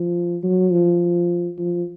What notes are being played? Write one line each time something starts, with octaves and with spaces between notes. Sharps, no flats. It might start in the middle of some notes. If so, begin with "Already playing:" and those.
Already playing: F3
F#3
F3
F3